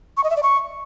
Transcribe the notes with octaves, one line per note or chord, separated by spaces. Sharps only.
C#6
D#5
E5
D5
C#6